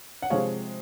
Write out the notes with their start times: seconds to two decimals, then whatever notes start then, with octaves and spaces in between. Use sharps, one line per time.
0.22 F#5
0.30 C3 F3 G#3 C#5 F5